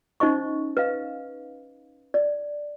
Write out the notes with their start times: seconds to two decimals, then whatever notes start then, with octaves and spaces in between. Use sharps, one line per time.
0.20 C#4 D#4 C5 D#5 C#6
0.77 B4 D#5 F5
2.14 D5